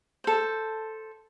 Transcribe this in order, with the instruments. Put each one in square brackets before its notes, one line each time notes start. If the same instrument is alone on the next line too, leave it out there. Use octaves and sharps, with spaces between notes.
[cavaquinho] A4 C5